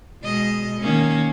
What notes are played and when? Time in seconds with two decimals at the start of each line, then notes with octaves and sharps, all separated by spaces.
0.23 B2 G#3 D#5
0.80 D#3 A#3 C#4